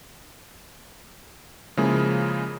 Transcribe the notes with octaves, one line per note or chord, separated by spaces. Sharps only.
C#3 F3 G#3 A#3 E4 G#4